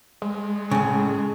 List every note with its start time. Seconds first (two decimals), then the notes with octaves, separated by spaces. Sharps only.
0.22 G#3
0.71 A2 C#3